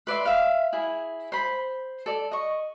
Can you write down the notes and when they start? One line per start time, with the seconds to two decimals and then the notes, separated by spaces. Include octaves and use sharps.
0.07 B4 D5 E5 C6
0.25 E5 F5
0.73 E4 G#4
1.32 C5 B5
2.06 A4 D5
2.31 D#5 C#6